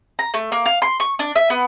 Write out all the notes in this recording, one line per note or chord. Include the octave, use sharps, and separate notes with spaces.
A#5
A3
A#3
F5
C6
C#6
D4
E5
B3